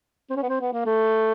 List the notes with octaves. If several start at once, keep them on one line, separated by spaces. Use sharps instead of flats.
C4
C#4
B3
C4
B3
A#3
A3